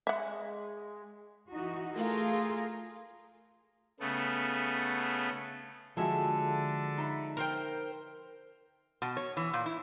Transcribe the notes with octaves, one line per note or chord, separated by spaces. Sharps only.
G#3 E5 F#5
E3 D#4 F#4
A3 F4 G#4 A#4
C#3 A3 B3
D3 F3 G#3 F#4 A4 E5 G#5
D#4 E5 B5
A#4 C5 G5
B2
C#5
E3
A#2
E4